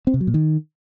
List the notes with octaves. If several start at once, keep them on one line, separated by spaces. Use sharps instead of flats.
C4
C3
F#3
A#2
D#3